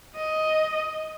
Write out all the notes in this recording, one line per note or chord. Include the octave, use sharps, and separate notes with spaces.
D#5